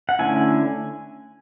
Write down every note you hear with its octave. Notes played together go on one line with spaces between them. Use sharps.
F#5
D3 A3 C#4 E4 G#5